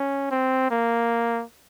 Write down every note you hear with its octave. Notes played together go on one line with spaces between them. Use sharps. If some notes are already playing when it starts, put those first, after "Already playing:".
Already playing: C#4
C4
A#3